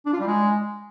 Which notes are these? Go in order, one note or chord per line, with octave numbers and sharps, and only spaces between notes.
D4
F4
G3
G#3